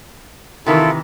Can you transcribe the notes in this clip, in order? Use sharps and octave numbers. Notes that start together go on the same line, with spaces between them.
C3 D#3 E3 E4 F4 A4